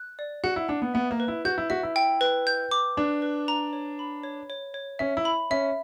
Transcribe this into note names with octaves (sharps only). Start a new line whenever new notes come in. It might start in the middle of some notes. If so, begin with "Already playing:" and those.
Already playing: F#6
D5
F#4 F#5
E4
D4 F#5
B3
B3 E5
A#3
B4
E4
F#4 G6
E4
F#4 E5
E4
G5
B4
G6
D6
D4 B4
B4
A#5
C#5
B5
C#5
C#5
C#5
C#4 E5
E4
B5
C#4 E5